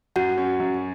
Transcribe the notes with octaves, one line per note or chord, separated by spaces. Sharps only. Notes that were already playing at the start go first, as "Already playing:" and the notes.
F#2 F#4 F#5
C#4
F#2